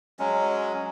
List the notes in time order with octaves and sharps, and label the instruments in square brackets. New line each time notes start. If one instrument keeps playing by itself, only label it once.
[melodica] F#3 G#3 C#4